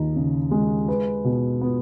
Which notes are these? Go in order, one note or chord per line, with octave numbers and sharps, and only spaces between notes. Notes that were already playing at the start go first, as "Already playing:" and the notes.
Already playing: D#2 D#4
C#3
G#3
B4
B2
B3